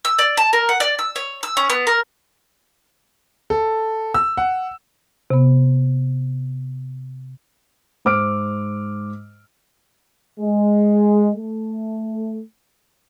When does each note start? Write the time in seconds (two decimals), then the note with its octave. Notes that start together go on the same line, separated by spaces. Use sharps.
0.05 E6
0.19 D5
0.37 A5
0.53 A#4
0.69 F#5
0.80 D5
0.99 E6
1.16 C#5
1.43 E6
1.57 C#4
1.70 B3
1.87 A#4
3.50 A4
4.14 E6
4.37 F#5
5.30 C3 B3
8.05 G#2 C5 D6 E6 F6 D7
10.40 G#3
11.36 A3